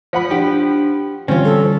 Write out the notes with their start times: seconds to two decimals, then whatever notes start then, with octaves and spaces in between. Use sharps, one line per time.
0.13 F3 F#5 B5
0.31 D4 G4
1.28 D3 E3 G3 C4 C#4 F4
1.45 A4